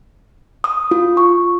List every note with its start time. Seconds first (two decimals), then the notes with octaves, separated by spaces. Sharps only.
0.64 D#6
0.91 F4
1.17 C#6